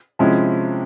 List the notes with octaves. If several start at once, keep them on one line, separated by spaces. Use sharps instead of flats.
C3 F3 G#3 C#4 E4